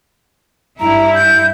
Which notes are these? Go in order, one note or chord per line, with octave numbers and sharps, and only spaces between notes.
G2 E4 A#5
G6